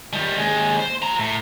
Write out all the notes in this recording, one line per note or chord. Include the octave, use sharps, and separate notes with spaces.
D#3 G3
D#2 G#3
C5
F3 A#5
A2